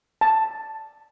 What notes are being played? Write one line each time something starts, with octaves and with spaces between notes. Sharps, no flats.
A5